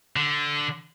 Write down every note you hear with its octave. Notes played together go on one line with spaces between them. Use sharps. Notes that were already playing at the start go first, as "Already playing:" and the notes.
D3